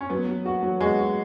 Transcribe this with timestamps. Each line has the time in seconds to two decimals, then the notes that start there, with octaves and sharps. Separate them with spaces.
0.01 C#4
0.10 F#3 B3
0.28 F#3
0.46 F#4
0.63 F#3
0.81 G#3 F#4
0.99 F#4